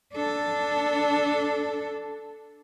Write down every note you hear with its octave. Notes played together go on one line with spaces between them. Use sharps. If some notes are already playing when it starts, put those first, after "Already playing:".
D4 A4